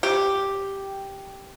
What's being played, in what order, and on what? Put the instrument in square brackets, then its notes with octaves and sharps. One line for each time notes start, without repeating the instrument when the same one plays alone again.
[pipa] G4